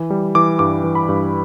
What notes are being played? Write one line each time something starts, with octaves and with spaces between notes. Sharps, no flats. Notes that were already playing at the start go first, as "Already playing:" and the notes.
Already playing: E3
G3
E3 D6
G2 D6
E3
B5
G2